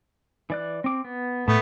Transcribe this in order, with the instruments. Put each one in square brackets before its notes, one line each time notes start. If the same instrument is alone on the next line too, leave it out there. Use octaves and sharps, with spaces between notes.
[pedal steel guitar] E3 D5 F#6
C4 D6
B3
[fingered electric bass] A2 [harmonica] A3 B3 [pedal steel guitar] A5